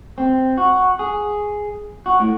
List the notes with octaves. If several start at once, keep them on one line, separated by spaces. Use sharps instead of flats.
C4
F#4
G#4
F#4
A2